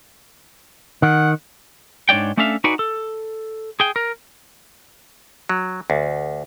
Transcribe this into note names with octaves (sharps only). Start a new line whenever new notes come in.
D#3 F#5
G#2 D4 C#5 D5 G5
A3 C#4 D4 A4 E5 F5
D#4 F#4 B4 D5 F#5 G#5
A4
G#4 G5
A#4
F#3
D2